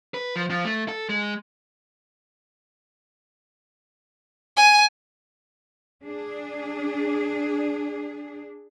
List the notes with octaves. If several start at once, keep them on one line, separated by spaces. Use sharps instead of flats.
B4
F3
F3
A3
A4
G#3
G#5
D4 G#4